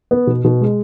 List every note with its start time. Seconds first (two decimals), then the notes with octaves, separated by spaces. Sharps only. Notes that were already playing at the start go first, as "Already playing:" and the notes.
0.11 B3
0.27 B2
0.44 B2
0.61 G#3